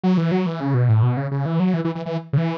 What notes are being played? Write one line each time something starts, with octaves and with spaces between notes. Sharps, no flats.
F#3
E3
F#3
E3
C#3
B2
A2
B2
C#3
C#3
E3
F#3
E3
E3
E3
E3
C#3
E3